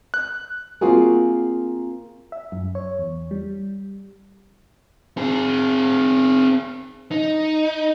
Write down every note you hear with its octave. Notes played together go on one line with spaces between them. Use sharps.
F#6
A#3 C4 F4 F#4 G#4 A#4
E5
F#2
C#5
E2
G3
C4 G#4
D#4